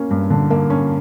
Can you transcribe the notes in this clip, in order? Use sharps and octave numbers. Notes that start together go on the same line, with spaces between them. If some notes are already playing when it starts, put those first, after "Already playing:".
Already playing: A#3 C#4
G2
D3
A#3
C#4